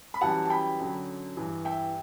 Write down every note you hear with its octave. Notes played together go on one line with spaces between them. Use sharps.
B5
F#2 E3 G3 F#5 A5
A5
G5 B5
F#2 D3 F#3
G2 E3 G3
E5 G5